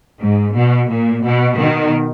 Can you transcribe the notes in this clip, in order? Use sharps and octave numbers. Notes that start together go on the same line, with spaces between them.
G#2
B2
A#2
B2
B2 D#3